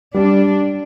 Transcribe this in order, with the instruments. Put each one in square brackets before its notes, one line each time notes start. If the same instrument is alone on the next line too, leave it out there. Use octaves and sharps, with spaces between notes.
[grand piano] G3 [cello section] D4